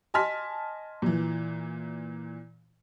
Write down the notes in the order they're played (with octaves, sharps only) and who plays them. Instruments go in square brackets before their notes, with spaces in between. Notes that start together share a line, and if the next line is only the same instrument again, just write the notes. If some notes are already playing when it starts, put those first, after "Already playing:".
[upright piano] D#5 G#5 A5 C6 F6 B6
A#2 E3